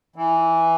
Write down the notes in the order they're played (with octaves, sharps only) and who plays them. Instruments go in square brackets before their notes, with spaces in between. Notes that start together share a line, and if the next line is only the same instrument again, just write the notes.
[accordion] E3